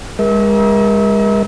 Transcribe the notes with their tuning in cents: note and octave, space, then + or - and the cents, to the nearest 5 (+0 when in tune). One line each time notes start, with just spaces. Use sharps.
G#3 -30 A#4 +35 E5 -40